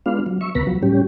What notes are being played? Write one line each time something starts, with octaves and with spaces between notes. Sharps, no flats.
G#3 B3 D4 F4 F5
F#3
E5 C#6
D2 C3 B3 B4 A#5 B5
F3 F#3
A2 G3 C#4 G4